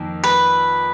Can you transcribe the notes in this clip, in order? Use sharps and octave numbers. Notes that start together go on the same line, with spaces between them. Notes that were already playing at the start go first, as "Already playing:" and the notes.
Already playing: F2 D#3 A#3
B4